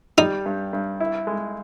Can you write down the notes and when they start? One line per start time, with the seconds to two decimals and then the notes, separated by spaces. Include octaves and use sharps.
0.18 G3 D#4
0.46 G2
0.73 G2
1.00 E4
1.27 G#3